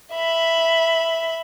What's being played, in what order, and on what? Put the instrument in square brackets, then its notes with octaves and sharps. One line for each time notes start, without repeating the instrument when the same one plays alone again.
[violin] E5 B5